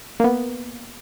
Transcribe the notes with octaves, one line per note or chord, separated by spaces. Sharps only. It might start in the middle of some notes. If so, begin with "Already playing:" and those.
A#3 B3